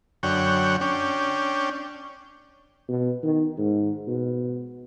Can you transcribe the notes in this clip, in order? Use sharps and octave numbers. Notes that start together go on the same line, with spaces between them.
F#2 D3 C#5 F#5 G5
C#4 D4 G5
B2
D#3
G#2
B2